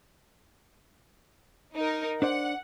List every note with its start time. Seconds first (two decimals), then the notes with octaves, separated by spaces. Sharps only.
1.75 D#4 A#4
2.22 D4 C5 D5 F#5